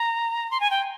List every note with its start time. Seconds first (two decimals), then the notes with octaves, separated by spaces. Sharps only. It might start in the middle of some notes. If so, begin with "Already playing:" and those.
Already playing: A#5
0.51 C6
0.60 G#5
0.70 G5